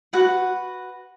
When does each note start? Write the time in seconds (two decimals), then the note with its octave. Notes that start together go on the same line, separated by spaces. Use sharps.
0.13 F#4 B4 F#5